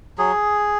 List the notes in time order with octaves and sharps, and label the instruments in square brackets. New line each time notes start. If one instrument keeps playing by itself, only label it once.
[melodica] F#3 G#4